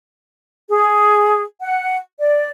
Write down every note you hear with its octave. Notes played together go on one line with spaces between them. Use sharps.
G#4
F#5
D5